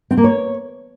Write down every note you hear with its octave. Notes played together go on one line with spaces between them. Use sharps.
C4
A#3
C#5